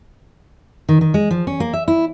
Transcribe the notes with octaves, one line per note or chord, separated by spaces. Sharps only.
D#3
D#3
G#3
F3
C#4
A#3
E5
E4